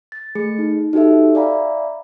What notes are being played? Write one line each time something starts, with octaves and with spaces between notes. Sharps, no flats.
A6
A3 G#4 C#7
D#4
D#4 F#4 G4 A4 E5
D5 E5 F5 G#5 A#5 B5